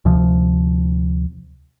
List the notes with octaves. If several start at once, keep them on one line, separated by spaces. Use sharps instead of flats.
D2 C3 F3